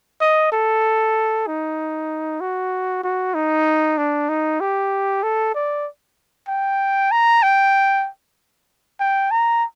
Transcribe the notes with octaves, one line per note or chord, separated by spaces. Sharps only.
D#5
A4
D#4
F#4
F#4
D#4
D4
D#4
G4
A4
D5
G5
A#5
G5
G5
A#5